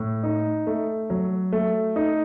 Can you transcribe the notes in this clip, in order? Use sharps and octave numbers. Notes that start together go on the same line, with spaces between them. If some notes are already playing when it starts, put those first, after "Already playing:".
Already playing: A2
D#4
A3
F#3
A3
D#4